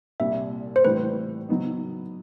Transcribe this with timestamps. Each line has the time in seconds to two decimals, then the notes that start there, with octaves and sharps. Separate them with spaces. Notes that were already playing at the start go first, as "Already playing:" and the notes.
0.20 C2 A#2 G3 E5
0.76 C5
0.85 A2 E3 G3 B4
1.49 F#3 B3 D#4